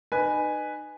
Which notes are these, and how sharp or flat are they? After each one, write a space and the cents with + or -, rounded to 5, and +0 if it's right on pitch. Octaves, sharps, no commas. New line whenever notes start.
D#4 -30 B4 +0 G#5 +0